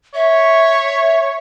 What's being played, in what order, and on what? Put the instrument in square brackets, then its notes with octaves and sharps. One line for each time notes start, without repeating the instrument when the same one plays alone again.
[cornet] C#5 [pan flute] E5